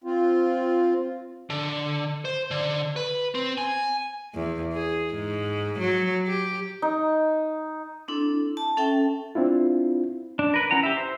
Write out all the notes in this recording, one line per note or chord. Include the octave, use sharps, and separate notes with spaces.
C4 F4
D3
C5
D3
B4
C4
G#5
E2
G#4
G#2
F#3
G4
D#4
C4 D4 E4 A4
A5
C#4 A4 E5 G5
C4 D4 E4 F4
D4
A#4 B4
C#4 E4 F#5 A#5
G4 E5
C5